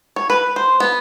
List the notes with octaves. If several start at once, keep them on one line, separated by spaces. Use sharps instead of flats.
C#5
B4
C5
B3